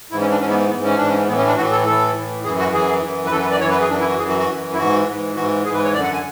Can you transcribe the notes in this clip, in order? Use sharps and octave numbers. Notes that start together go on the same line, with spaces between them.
G#2 E3 E4
C#4
D4
G#2 E3 C#4
B3
G#2 E3 B3
C#4
G#2 E3 D4
C#4
A2 E3 B3
C#4
D4
A2 E3 F#4
A4
A2 E3 A4
A2 E3
F#2 E3 G#4
F#4
F#2 E3 G#4
F#2 E3
B4
F#2 E3 A4
B4
D5
F#2 E3 C#5
B4
G#4
F#2 E3 D4
E4
F#4
F#2 E3 G#4
F#4
F#4
F#2 E3
E4
G#2 E3 F#4
G#2 E3
G#2 E3 F#4
G#2 E3 G#4
B4
C#5
F#2 D3 D5
F#5
G#5